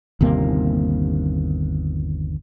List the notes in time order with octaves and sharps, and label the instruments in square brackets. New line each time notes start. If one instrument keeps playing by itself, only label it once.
[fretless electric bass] G1 D#2 C3 A#3